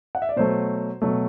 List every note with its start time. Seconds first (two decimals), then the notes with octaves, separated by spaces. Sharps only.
0.15 F#5
0.22 E5
0.29 D5
0.36 B2 F#3 A3 C5
1.02 B2 F#3 A3